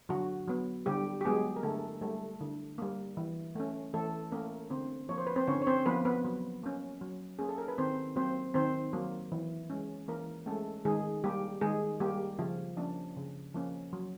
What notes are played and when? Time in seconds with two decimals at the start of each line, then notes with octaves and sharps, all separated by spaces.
0.09 D3 F#3 F#4
0.47 F#3 B3
0.86 D3 G3 G4
1.21 G4
1.25 F#3 G#3 B3 G#4
1.56 A#4
1.63 D3 A3 A4
2.01 G3 A3 A#3 A4
2.40 D3
2.78 G3 A#3
3.17 E3
3.55 A3 C#4
3.94 E3 A3 A4
4.32 A3 A#3 C#4 A#4
4.70 D3 C4 C5
5.09 F3 A#3 C#5
5.18 C5
5.27 B4
5.36 C4 C5
5.47 D3 C#4 C#5
5.62 C#5
5.67 C4 C5
5.86 F3 A#3 B3 B4
6.05 B3 B4
6.24 F#3
6.63 A#3 C#4
7.01 F#3
7.39 A#3 C#4 G#4
7.49 A4
7.58 A#4
7.68 B4
7.78 D#3 C4 C5
8.16 F#3 A#3 C4 C5
8.54 D#3 C4 C5
8.93 F#3 A#3
9.32 E3
9.70 G#3 C#4
10.08 E3 A#3 A#4
10.46 G#3 A3 C#4 A4
10.85 D#3 G#3 G#4
11.24 G3 A#3 G4
11.61 D#3 G#3 G#4
12.00 G3 A#3 G4
12.39 C#3 F3 F4
12.77 F3 A#3 C#4 D4
13.16 C#3
13.54 F3 A#3 C#4
13.93 F#3